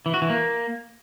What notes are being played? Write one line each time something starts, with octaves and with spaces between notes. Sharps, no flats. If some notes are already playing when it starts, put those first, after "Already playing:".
E3
F#4
E3
A#3